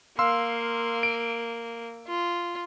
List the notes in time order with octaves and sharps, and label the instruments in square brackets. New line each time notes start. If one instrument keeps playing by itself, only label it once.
[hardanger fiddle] A#3 [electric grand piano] F5 C6 E6
[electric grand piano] D7
[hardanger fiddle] F4